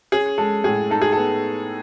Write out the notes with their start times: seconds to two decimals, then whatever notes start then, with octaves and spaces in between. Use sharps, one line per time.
0.12 C#4 G#4
0.38 G#3 A4
0.64 A2 G#4
0.90 D#4 A4
1.01 G#4
1.12 B3 A4